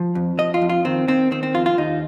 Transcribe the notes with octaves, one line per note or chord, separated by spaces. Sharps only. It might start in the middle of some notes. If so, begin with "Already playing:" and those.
Already playing: F3
F2
F3 D#5
F4
F2
F4
D#3 C4
D#3 C4
D#3 C4
C4
F2 F4
F4
D#2 D#4